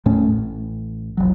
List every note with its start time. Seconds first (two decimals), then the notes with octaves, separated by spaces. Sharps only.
0.06 D#1 A2 A3 C#4
0.32 A1
1.17 E1 A#1 F#3